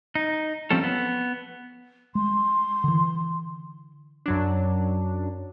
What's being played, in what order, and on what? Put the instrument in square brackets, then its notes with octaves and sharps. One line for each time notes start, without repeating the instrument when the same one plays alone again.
[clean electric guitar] D#4
F3 G3 C4 C#4 A4
B3
[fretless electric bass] G#3 [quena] C6
[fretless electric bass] D3 E3
[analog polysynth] F#2 F#3 D4